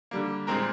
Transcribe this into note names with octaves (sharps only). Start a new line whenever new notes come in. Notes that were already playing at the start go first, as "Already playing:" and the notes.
D3 G3 A#3
A#2 G#3 C4 A#4 A#5